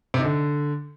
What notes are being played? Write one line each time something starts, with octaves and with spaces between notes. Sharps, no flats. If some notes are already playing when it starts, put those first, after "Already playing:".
C3
D#4
D3